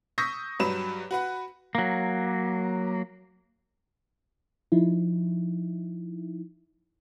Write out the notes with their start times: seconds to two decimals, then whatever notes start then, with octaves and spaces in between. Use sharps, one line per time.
0.18 C#6 D#6 E6 G6 A#6 B6
0.60 G2 F#3 B4 E7
1.11 F#4 B4 F#5
1.75 F#3 A#3
4.72 F3 D#4 E4